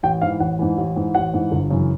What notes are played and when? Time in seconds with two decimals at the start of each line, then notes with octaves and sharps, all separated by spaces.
0.03 A1 G5
0.21 G#2 E3 F5
0.40 A1 F#5
0.59 G#2 E3
0.77 A1
0.96 G#2 E3
1.15 A1 F#5
1.33 G#2 E3
1.52 G1
1.70 F#2 C#3 E3